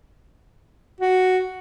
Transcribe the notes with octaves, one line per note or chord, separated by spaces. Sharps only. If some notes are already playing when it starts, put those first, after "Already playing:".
F#4